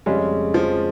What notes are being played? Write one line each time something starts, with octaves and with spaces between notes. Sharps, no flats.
F2 C#3 G3 G#3 C#4
F3